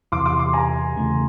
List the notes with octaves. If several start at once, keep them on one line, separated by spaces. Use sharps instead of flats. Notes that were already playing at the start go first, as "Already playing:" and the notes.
E2 C3 E3 C6 D6
C6 D6
C6 D6
G#5 A#5
E2 C#3 E3 A3